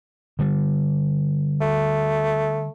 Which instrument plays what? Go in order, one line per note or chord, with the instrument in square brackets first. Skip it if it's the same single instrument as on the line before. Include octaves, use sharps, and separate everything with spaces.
[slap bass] D3 G3
[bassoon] A3